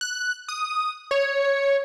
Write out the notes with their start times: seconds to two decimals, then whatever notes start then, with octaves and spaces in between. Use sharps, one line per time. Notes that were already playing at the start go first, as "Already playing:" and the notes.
0.01 F#6
0.49 D#6
1.11 C#5